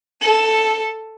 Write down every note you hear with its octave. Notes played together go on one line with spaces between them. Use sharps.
A4